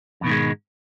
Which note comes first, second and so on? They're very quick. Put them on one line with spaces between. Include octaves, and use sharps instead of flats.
F2 B2 D#3 G#2 G#3